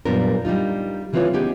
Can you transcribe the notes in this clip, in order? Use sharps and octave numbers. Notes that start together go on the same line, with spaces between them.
F#2 A#2 G3 B3 D4 A#4
G3 D4 D#4 F4
C#3 E3 C4 F4 B4 C#5
B3 C#4 D#4 G4 G#4